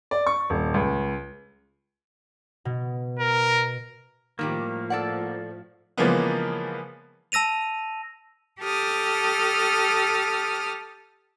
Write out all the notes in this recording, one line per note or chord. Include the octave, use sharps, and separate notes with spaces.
D5
C#6
D#1
C#2
B2
A#4
A2 D#3 F3 G3 A#3 G4
A4 D5 F#5
C#3 E3 F3 G#3 A#3 B3
A5 E6 A#6 D#7 F7
G4 A4 A5 D#6 F6